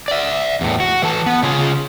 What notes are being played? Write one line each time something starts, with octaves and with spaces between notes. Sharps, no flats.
D5 E5
E2 A2
F#4
E3 A4 A5
B3
C#3 F4 G#4